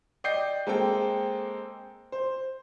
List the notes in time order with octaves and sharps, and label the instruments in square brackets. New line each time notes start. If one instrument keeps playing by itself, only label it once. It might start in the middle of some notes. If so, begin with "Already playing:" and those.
[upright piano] D5 D#5 G5 G6 C7
G#3 A#3 C4 A4 G5
C5